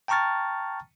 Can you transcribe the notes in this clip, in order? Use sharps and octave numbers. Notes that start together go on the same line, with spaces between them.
G5 A5 A#5 C#6 F6 A6